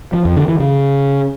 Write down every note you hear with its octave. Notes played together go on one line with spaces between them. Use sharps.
F3
F2
D3
E3
C#3